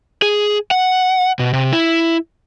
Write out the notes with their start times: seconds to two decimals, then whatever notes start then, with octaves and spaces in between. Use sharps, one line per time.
0.22 G#4
0.71 F#5
1.39 B2
1.53 C3
1.73 E4